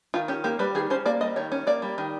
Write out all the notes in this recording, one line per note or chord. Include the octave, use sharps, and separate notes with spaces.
D#3 F4
C#4 G4
A#3 G4
G3 B4
D#3 G#4
C#4 C5
A#3 D5
G3 D#5
D#3 C#5
C#4
A#3 D5
G3
D#3